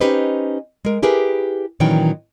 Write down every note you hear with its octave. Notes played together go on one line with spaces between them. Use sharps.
C#4 D#4 G4 B4 C5 D#5
G#3 A#4
E4 G4 G#4 A#4 B4
A#2 D#3 E3 F#3 C#4 G5